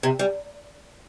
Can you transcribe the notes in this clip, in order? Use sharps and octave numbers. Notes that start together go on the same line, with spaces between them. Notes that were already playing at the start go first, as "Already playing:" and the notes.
C3
G3